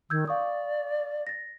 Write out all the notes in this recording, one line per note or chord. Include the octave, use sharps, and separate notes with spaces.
D#3 E6 G6 G#6
D5 F5 C#6 D#6
A6 A#6